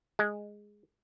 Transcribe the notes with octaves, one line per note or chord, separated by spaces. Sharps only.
G#3